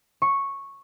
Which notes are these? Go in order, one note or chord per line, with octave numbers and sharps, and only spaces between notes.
C#6